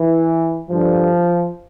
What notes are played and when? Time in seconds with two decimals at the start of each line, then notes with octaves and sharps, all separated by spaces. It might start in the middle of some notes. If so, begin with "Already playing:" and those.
Already playing: E3
0.69 G2 D3 F3